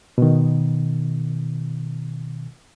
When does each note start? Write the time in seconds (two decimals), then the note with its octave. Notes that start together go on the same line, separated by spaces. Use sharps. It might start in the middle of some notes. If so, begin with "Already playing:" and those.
0.18 B2 D#3